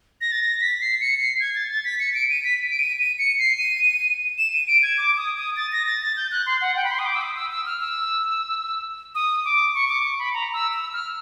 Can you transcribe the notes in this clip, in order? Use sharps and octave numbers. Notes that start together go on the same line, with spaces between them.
A#6
A6
A#6
B6
C7
C#7
C7
G#6
A6
A6
B6
C#7
D7
D#7
B6
D7
D#7
D#7
C#7
C7
D#7
E7
D#7
D7
G#6
D6
D#6
D#6
A6
A#6
A6
A6
G6
F#6
C6
F#5
G5
B5
C6
D#6
D6
E6
D#6
E6
E6
F6
E6
D#6
D6
C#6
D6
C#6
B5
A#5
E6
E6
F6